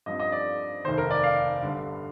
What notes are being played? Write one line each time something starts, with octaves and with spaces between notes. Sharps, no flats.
G2 F3 C4 D#5
D#5
D5
F1 D#2 D#3 C5
A#4
D5
F5
G1 G2 D3